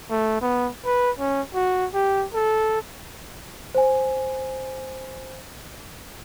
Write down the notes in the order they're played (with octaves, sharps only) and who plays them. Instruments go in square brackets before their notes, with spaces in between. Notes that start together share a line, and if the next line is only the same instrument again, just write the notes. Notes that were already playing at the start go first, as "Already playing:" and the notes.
[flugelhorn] A3
B3
B4
C#4
F#4
G4
A4
[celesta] C5 G#5